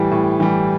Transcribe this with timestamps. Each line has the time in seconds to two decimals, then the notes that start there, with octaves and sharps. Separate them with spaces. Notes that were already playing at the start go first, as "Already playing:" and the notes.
Already playing: A2 E3 G3
0.11 A2
0.40 E3 G3